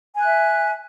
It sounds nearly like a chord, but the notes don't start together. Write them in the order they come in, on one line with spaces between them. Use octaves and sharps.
G#5 F#6 E5